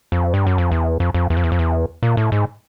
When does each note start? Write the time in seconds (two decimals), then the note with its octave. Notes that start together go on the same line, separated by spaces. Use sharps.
0.12 F2
0.34 G2
0.47 F#2
0.58 F2
0.71 E2
1.00 F2
1.14 F2
1.30 E2
1.37 F2
1.44 E2
1.52 F2
1.59 E2
2.03 A#2
2.17 A2
2.32 G#2